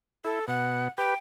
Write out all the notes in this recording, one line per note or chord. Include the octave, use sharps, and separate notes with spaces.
E4 A4
B2 F#5
G4 B4 G5